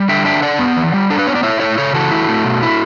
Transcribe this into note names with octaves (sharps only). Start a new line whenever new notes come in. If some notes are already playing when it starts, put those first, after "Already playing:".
Already playing: G3
D3 E5 G5
D4 E5 G5
D4 D5 F#5
B3
E3
G3
D4 A4
B4
B3 C#5
D5
E4 C#5 E5
A3 A4 C#5
C#3 A4 C#5
E3 F#4 A4
E4
A3
B2
E4